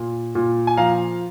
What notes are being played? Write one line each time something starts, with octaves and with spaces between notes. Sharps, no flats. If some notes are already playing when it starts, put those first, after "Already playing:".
Already playing: A#2
A#2
G#5
F3 F5 A#5